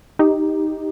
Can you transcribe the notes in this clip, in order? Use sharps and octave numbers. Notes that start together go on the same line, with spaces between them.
D#4 G4